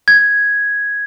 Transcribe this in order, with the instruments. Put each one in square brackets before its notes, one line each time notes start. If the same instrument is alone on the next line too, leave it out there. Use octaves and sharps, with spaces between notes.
[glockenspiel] G#6